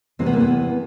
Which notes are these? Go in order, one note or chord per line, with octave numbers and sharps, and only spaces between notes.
E2 C3 E3 C4
B3
A#3
B3